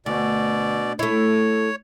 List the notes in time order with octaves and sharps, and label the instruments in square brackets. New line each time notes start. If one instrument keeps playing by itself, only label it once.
[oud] D2 [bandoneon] B2 D5
[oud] A3 E4 [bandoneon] C#5